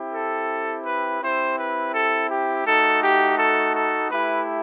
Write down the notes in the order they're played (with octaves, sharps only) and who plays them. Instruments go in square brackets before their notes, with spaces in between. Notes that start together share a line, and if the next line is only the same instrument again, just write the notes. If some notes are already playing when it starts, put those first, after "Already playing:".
Already playing: [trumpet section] C4 E4 G4
A4
B4
C4 E4 G4 C5
B4
A4
G4
A3 D#4 F#4 A4
G4
A4
A4
A3 E4 G4 B4